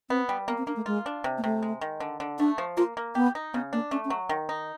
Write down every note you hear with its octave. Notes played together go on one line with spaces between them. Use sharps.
B3 C4
G3
A#3 B3
C4
A#3 D4
A3
G#3 F4
D4
C3
A#3
C3 A3
G#3
D#3
D3
D3
A3 D4
F3
A#3 F4
A#3
B3 G4
D#4
C#3 B3
A#3 D4
A3 C#4
C#4
F#3
D#3
D#4